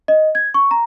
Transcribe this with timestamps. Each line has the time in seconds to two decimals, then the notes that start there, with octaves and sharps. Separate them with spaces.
0.08 D#5
0.35 G#6
0.54 C#6
0.71 A#5